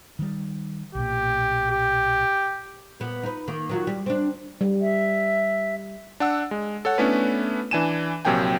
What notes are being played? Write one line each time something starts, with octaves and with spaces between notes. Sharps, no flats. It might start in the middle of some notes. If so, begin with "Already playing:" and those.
D#3 G3
B1 A#2 G4
G4
A#2 B3
D#4 B4
D#3 A#3
D#3 F#3 F4
G3
C4 D4
G3
E5
D4 F#5 E6
G#3
A4 C#5 F#5
A3 B3 C#4 D4 E4 B4
E3 D4 G#5 D#7 E7
A#1 C3 F#3 A#3 G5 G#5